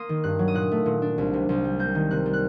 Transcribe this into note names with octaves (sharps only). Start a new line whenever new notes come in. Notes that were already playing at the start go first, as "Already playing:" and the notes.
Already playing: A#3 C6 D#6
D#3
G2 F#6
F#3
D#6
A#2 F#6
A3
A#2
D4
C2
C3
C2
G3
A#3 G6
D#3
C3 F#6
G3
F#6